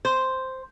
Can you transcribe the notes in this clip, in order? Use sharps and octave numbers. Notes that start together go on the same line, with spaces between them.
C5